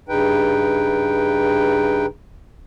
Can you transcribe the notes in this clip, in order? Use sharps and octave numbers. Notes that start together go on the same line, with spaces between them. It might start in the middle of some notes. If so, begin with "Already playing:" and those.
G2 C#3 D#4 B4 G5